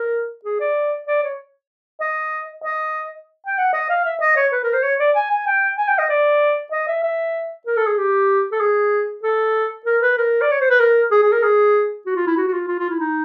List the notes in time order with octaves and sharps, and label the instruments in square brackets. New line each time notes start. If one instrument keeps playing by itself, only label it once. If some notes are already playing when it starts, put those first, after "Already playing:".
Already playing: [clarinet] A#4
G#4
D5
D5
C#5
D#5
D#5
G5
F#5
D#5
F5
E5
D#5
C#5
B4
A#4
C5
C#5
D5
G#5
G#5
G5
G#5
G5
D#5
D5
D#5
E5
E5
A#4
A4
G#4
G4
A4
G#4
A4
A#4
B4
A#4
D5
C#5
C5
B4
A#4
G#4
G#4
A#4
G#4
F#4
F4
E4
F#4
F#4
F4
F4
F4
E4
D#4